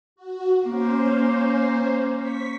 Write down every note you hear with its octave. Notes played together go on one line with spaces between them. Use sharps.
F#4
A#3 C#4 C5
C#6 B6